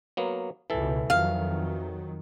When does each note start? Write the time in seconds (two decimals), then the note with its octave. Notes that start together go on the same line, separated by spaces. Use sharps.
0.17 F#3 A#3 B3
0.70 C#2 B2 E3 A4
1.10 F2 D#3 F#3 F5